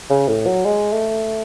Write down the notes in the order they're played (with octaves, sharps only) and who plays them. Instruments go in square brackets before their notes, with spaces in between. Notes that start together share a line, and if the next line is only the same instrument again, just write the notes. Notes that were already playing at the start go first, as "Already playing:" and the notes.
[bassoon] C#3
A2
F#3
G#3
A3